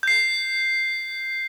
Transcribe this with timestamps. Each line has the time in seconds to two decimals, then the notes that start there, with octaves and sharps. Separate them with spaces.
0.03 G6 C7